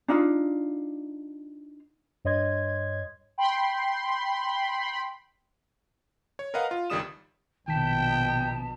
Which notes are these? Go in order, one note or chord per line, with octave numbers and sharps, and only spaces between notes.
D4 D#4 F4
G2 C#5 D#5 C6 G#6
G5 B5 C6
C#5
A#4 B4 D#5 F5 F#5
F4
G1 C#2 D#3 G3 D#6 E7
A#1 B2 D#3 G5 A5 B6